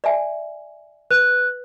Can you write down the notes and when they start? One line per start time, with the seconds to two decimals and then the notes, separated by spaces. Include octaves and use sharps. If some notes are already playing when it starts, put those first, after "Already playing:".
0.04 D5 E5 G#5
1.11 B4 F#6